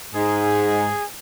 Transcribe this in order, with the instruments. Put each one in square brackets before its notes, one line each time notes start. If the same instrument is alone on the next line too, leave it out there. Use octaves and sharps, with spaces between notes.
[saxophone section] G#2 [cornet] G#4